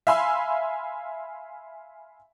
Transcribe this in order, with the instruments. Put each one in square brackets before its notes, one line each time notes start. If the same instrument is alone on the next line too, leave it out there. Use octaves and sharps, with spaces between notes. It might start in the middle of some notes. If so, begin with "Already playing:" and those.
[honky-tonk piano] E5 F5 G#5 B5 C6 E6